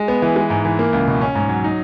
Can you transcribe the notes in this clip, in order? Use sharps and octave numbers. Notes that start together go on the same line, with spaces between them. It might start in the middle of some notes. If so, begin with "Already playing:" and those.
Already playing: G#3
B3
E3
G#3
G#2
E3
A#3
C#2
B2
C#4
G#2
F#3
D#4